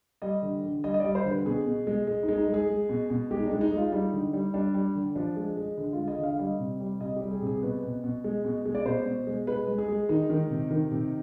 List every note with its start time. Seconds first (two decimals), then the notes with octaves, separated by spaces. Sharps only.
0.22 G3 D#5
0.42 D3
0.63 D3
0.84 G3 D#5
0.94 D#5
1.00 G3 D5
1.15 C5
1.25 D3
1.30 B4
1.45 B2 G#4
1.66 B2
1.87 G#3
2.07 G#3
2.23 D#4
2.28 G#3
2.38 D#4
2.48 G#3
2.54 G#4
2.69 G#3
2.89 B2
3.10 B2
3.31 G#3 G4
3.38 D#4
3.46 G#3 D4
3.61 D#4
3.72 G#3
3.77 F4
3.92 G3 D#4
4.13 D3
4.33 G3
4.54 G3 D4
4.74 G3
4.95 D3
5.15 F3 D4
5.36 G#3
5.57 G#3
5.78 D3
5.93 G#3 F4
6.08 D#5
6.18 D3 F5
6.39 G3 D#5
6.60 C3
6.80 G3
7.00 C3 D#5
7.16 G4
7.22 G3
7.31 G#4
7.42 C3 G#4
7.62 B2 B4
7.83 B2
8.04 B2
8.24 G#3
8.44 B2
8.65 G#3
8.75 D5
8.86 B2 C5
9.06 B2
9.27 G#3
9.47 G#3 B4
9.67 G#3
9.78 G#4
9.88 G#3
10.09 D#3 D#4
10.30 D#3
10.50 C3
10.71 D#3
10.91 C3